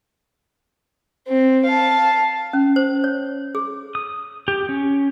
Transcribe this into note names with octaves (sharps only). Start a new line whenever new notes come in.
C4
F5 A5
C#4
C5
C#5
G#4
D#6
G4
C#4